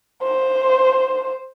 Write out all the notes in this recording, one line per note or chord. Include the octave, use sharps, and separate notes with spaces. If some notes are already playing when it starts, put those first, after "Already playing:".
C5